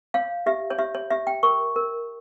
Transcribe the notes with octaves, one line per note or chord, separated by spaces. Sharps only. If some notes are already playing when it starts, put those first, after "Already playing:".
C#5 F5
G4 E5
C#5
G4 E5
C#5
G4 E5
G5
A#4 C#6
A#4